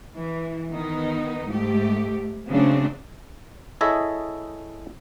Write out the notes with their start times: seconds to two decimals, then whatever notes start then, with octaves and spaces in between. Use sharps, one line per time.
0.14 E3
0.70 D#3 B3 D#4
1.48 G#2 A3 G4
2.47 C#3 F#3 A3 C4 D4
3.81 E4 G#4 A4 C#5 D#5 E5